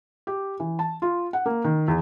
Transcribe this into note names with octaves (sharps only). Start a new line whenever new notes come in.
G4
E3
A5
F4
F#5
A#3
D#3
E2